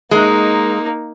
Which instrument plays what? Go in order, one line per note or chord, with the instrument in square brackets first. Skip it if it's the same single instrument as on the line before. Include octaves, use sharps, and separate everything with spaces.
[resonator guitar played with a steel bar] G#3 [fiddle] A#3 D#4